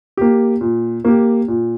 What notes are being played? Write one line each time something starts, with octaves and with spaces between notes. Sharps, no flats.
A#3 G4
A#2
A#3 G4
A#2